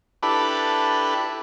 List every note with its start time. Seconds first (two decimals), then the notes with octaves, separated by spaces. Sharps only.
0.23 D4 E4 G4 A4 B4